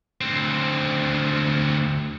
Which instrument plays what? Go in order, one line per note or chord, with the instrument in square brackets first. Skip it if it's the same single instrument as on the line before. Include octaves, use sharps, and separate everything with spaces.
[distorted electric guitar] D2 C4